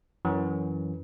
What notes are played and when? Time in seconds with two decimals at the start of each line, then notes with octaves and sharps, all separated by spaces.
0.25 F#2 E3